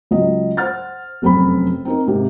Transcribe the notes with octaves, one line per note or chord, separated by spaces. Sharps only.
C#2 F#3 D#5
C5 F#5 F6 A6
F1 F#2 C4 A4 B5
C4 D#4 A#4
G#2 C3